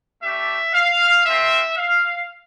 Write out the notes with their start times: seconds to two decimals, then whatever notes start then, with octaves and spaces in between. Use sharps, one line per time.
0.22 A3 D4 G4 E5
0.74 F5
1.25 A3 C4 F4 E5
1.77 F5